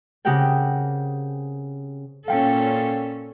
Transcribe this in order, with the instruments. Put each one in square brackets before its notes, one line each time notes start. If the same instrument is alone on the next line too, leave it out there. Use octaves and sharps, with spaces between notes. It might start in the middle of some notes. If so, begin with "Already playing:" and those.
[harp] C#3 C4 G4 A#4 F#5 G5
[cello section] A#2 C#4 A4 [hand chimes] F5 G5